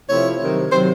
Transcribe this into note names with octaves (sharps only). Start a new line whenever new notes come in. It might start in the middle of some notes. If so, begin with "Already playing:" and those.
C3 F3 A3 C4 E4 C#5
C3 D#3 F#3
C3 D#3 F#3 C5